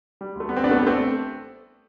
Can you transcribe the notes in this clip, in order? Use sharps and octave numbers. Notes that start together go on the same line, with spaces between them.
G3
D2 A3
G3 B3
C4
A1 B3 D4
A3
A1 B3
A3 C4